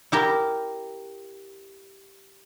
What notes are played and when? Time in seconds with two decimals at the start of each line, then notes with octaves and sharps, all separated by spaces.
0.12 E4 G4 A#4